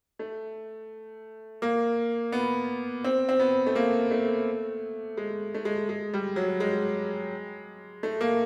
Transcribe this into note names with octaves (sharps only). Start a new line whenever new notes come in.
A3
A#3
B3
C4
C4
B3
A3
A#3
A3
G#3
A3
G#3
G#3
G3
F#3
G#3
A3
A#3